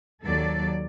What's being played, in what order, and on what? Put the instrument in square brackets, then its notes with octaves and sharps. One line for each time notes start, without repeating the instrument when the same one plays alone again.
[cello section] D#2 F#3 A4 D5